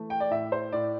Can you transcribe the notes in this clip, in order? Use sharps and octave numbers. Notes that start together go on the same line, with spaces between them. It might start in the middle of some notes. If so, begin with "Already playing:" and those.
Already playing: E3 A3
G5
D5
A2 E5
C5
A2 D5